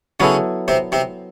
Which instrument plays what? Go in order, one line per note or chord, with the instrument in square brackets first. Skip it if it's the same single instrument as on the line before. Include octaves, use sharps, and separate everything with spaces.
[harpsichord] C#3 C#4 [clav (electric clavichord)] F#3 B3 E4 A4
[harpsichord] C3 C4
C3 C4